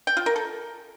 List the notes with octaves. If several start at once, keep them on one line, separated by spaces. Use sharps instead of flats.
G5
F4
A#4
A4